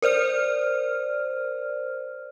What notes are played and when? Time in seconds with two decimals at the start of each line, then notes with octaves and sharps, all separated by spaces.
0.02 A#4 C5 D5 F6